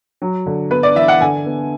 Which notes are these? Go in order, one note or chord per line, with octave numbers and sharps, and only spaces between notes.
F#3
D3
B3 B4
D5
E3 E5
F#5
D3 G#5
B3